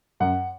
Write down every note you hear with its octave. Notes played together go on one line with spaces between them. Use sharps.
F#2 F#5